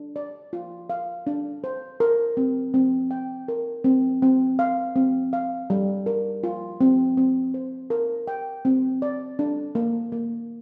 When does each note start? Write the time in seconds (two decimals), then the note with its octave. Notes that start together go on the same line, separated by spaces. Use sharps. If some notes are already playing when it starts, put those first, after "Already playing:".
Already playing: D4
0.16 D5
0.53 F4
0.90 F5
1.27 D4
1.64 C5
2.00 A#4
2.37 C4
2.74 C4
3.11 G5
3.48 A#4
3.84 C4
4.22 C4
4.59 F5
4.96 C4
5.33 F5
5.70 G3
6.06 A#4
6.43 F4
6.81 C4
7.17 C4
7.54 C5
7.90 A#4
8.27 G5
8.65 C4
9.02 D5
9.39 D4
9.75 A#3
10.12 A#3